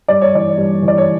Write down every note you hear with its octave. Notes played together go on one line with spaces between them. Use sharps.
G2 D5
C#5
E3 D5
G2
E3
D5
C#5